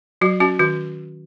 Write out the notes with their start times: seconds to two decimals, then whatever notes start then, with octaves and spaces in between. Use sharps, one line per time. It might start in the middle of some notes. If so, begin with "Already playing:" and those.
0.21 F#3 F#4
0.40 C#4 F#4
0.60 D#3 F#4